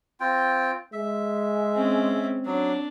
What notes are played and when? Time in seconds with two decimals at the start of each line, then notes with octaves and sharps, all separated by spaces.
0.20 C4 F4 G5
0.93 G#3 E5
1.74 C4 C#4
2.46 F#3 D4